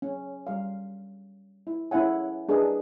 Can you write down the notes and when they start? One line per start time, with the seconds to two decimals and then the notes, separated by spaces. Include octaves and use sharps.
0.02 C#4
0.47 G3 F5
1.67 E4
1.91 C#4 E4 A#4 E5 F#5 G#5
2.49 D4 G#4 A#4 B4 D#5